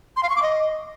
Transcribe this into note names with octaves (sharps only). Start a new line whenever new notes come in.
C6
F5
C#6
D6
D#5